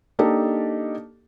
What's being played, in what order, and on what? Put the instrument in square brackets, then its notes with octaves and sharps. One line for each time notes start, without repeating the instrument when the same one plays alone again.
[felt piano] A#3 D4 D#4 G4 A4